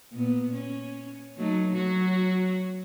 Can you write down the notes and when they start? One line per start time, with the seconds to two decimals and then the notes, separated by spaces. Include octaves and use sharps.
0.13 A#2 B3
0.54 C#4
1.37 F#3 A3 D#4
1.73 F#3 F#4